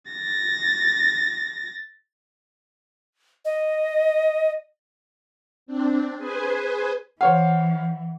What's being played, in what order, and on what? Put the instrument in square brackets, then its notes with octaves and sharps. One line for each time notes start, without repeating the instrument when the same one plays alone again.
[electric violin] A6 A#6
[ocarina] D#5
[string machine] C4 D4
G#4 B4 C5 G#5
[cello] E3 [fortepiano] C5 C#5 F5 [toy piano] F#5